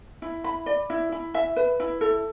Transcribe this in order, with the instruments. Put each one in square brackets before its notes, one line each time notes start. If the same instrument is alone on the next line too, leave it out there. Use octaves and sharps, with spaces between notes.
[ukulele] E4
B5
D5
E4
E4
E5
B4
E4
A4